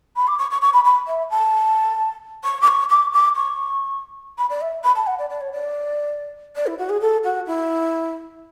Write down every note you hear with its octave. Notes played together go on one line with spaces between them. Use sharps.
B5
D6
C#6
C#6
C#6
B5
B5
E5
A5
C#6
D6
C#6
D6
D6
C#6
B5
D5
E5
B5
A5
F#5
D5
D5
C#5
D5
D5
E4
F#4
G#4
A4
F#4
E4